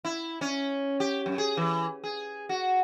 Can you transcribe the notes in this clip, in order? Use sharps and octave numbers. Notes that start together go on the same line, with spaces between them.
E4
C#4
G4
F#2
G#4
E3
G#4
F#4